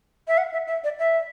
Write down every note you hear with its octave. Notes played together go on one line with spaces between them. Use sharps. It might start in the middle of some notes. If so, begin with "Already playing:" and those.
E5
F#5
E5
E5
D5
E5